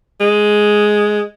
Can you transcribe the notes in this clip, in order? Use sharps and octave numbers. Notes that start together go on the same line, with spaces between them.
G#3